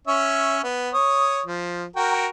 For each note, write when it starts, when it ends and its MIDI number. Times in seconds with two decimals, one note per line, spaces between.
0.07 0.60 61
0.07 0.60 73
0.07 0.60 76
0.64 0.90 59
0.94 1.41 73
0.94 1.41 87
1.46 1.85 53
1.96 2.27 66
1.96 2.27 70
1.96 2.27 79